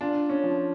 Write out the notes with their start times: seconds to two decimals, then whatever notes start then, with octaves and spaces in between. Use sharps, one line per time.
0.01 D4 F4
0.30 C#4
0.44 F3